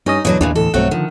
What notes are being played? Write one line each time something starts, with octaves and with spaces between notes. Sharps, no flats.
G2 C#4 D#4 D#5
E2 B2 F#3 D4 D#5
D#2 A#2 E3 G#3 D4
D2 A2 E3 A4
B1 G2 F#3 A3 C4 C#5 F#5
D3 D#3 F3